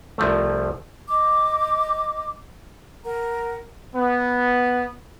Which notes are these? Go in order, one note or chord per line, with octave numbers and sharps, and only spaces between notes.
C2 F3 A3
D#5 D6
A#4 F#5 A#5
B3